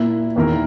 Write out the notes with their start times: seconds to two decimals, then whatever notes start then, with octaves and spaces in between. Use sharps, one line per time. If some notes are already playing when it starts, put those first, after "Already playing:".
Already playing: A#2 A#3 E4
0.36 E2 D#3 A#3 E4 A#4